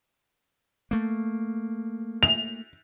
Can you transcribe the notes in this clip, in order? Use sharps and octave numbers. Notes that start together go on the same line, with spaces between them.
A3 A#3
F7